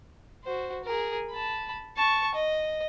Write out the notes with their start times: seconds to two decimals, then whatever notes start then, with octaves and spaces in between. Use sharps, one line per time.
0.44 F#4 C5
0.84 G#4 A#4
1.31 A5 B5
1.96 A5 C#6
2.34 D#5